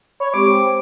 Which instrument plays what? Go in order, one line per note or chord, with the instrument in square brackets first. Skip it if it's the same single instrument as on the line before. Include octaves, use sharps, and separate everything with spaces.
[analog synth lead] C#5 [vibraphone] B5
[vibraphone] G#3 C4 G4 [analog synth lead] D6
[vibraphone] C5 C#5 G5